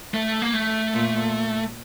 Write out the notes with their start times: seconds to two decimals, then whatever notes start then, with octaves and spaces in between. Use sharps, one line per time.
0.14 A3
0.42 A#3
0.54 A3
0.94 A#2